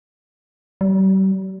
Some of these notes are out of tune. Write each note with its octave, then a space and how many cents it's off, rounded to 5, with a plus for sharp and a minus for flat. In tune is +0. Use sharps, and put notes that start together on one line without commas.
G3 -40